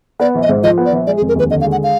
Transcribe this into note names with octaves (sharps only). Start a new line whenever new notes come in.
B3 D5
A#1
D#5
G#2
F3 D#5
B3
D5
A#1
G#3 D5
G#4
F1
A#4
D#2 B4
D3 D#5
F5
G#3
F#5
F5